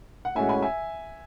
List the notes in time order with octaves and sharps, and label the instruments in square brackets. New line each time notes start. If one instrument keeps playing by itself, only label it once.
[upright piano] F#5
[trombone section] A2 G#3 C#4 F#4 [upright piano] E5 G#5
[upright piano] G#5 B5
E5 G#5